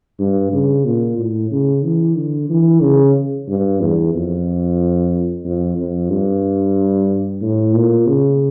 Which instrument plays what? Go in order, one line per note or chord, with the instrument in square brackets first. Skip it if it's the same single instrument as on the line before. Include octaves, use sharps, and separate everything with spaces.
[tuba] G2
C#3
A#2
A2
C#3
E3
D3
E3
C#3
G2
E2
F2
F2
F2
G2
A2
A#2
C#3